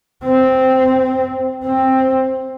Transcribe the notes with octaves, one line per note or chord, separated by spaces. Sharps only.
C4
C4